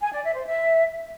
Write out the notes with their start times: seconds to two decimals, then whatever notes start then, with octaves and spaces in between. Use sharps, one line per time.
0.01 G#5
0.12 D5
0.24 E5
0.35 C5
0.46 E5